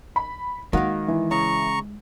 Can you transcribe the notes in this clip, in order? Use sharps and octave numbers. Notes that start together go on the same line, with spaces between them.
B5
D#3 G#3 A#3 F#4 F5 F#5
E3
C#3 A#5 C#6